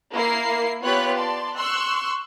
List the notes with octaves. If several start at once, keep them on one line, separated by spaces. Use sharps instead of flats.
A#3 E4 C7
B3 F4 G4 C#5 B5 F#6
D5 A5 C6
C6 C#6 E6 F#6